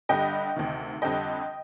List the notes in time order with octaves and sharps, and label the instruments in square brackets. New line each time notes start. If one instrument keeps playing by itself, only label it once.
[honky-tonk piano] G2 D3 G3 D#5 G5
D2 C3 D#3
F2 D3 G3 C4 D#5 G5